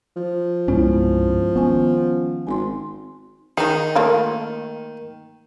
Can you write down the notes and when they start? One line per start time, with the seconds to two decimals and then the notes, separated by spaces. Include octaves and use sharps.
0.16 F3
0.68 C2 G2 G#3 B3 C#4 E4
1.55 D#3 B3 C#4 G#5
2.47 G#1 G#5 C6
3.58 D#3 D#4 G#4
3.96 A3 A#3 F4